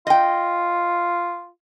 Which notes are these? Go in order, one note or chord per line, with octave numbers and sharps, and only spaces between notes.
F4 D#5 G5